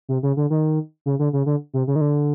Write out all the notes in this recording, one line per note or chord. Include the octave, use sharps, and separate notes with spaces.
C3
C#3
D3
D#3
C#3
D3
C#3
D3
C3
C#3
D#3
D3